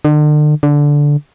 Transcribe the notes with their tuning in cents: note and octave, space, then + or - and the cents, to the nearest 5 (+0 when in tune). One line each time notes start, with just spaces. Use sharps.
D3 +40
D3 -10